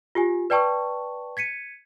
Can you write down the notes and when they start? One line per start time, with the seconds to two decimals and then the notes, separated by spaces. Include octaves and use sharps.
0.15 F4 G4 G#5
0.50 B4 D5 G5 A5 C#6 E6
1.37 G#6 B6 C#7 D#7